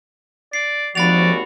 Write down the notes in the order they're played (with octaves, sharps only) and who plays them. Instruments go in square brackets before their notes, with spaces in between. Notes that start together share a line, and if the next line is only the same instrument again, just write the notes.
[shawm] D5 [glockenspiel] C7
[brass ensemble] G#1 D#2 F#4 [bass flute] F3 [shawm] D5 [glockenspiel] B5 A6 F7